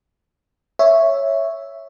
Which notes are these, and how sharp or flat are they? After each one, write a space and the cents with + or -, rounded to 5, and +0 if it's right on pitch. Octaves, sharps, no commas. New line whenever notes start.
C#5 +0 E5 +0